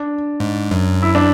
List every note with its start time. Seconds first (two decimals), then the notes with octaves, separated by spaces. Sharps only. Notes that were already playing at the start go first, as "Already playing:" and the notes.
Already playing: D4
0.40 G#2
0.71 F#2
1.02 E4
1.15 D4